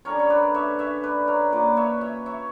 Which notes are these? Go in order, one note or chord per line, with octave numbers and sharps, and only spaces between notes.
D3 G3 C#4 A#4 C#5
C#5
B4 D5
C#5 E5
C#5 E5
B4 D5
A#4 C#5
A#2 A#3 C#4 B4 D5
C#5 E5
C#5 E5
C#5 E5